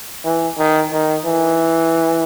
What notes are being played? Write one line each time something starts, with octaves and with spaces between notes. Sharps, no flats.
E3
D#3
D#3
E3